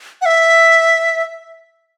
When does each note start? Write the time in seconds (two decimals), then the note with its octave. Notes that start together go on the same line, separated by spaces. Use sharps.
0.22 F#5
0.26 E5